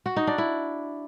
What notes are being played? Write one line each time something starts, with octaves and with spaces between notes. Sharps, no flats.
F#4
D#4
D4
E4